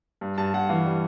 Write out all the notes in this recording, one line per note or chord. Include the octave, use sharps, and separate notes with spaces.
G2
G2 A5
G2 F#5
E3 F5
G3